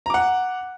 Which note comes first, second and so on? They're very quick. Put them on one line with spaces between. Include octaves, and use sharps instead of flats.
A#5 D6 F#5